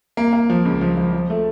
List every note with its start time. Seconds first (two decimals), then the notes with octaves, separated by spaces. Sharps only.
0.17 A#3
0.33 A#3
0.50 F3
0.65 C#2
0.81 F3
0.97 F3
1.13 F3
1.30 A3